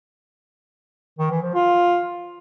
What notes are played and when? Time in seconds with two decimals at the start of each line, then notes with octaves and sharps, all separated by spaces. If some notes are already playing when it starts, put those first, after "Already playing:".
1.19 D#3
1.31 E3
1.43 F3
1.54 F4